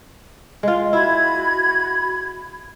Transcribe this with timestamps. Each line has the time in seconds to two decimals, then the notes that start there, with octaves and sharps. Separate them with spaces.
0.63 G#3 F4
0.93 E4 F#4 B5 G#6